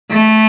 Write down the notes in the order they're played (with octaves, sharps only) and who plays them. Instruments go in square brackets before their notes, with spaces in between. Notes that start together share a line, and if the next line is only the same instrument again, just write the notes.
[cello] A3